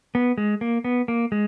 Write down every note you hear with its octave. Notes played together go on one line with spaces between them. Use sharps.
B3
G#3
A#3
B3
A#3
G#3